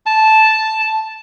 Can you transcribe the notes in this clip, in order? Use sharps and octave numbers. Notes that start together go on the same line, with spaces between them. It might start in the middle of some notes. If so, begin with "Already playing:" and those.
A5